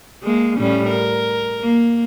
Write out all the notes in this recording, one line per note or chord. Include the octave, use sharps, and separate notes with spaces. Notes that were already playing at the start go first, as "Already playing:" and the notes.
G#3 A#3
A2 G3 C#4
A#4
A#3